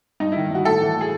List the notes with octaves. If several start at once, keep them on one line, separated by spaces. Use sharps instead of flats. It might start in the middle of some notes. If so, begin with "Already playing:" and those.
G2 D#4
D#3 E4
G2 F#4
A2 A4
E3
A2 G#4